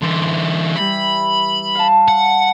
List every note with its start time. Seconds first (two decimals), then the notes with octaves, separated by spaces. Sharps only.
0.02 D3 E3 C6
0.76 E3 G3 B5
1.75 F5 A5
2.08 F#5